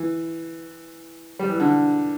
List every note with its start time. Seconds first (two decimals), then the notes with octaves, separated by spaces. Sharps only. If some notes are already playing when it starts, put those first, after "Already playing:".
Already playing: E3
1.39 G3
1.49 E3
1.60 D3